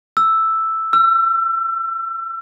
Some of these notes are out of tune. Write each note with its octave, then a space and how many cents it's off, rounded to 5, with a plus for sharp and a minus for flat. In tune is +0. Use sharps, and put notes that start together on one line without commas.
E6 +0
E6 +35